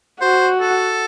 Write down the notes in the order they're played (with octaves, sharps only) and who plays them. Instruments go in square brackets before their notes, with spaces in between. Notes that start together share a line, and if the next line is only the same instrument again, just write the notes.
[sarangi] F#4 [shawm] C5
[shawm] A4